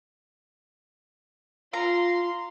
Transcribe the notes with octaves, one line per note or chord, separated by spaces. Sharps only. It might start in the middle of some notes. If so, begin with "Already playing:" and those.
F4 F5 A#5 C6